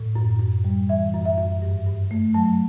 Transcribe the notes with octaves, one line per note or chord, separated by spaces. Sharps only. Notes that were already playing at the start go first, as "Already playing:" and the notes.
Already playing: A2
F#2
F#2
G3
E3 E5
F#2
E5
F#2
G2
G2
A3
F#3 A5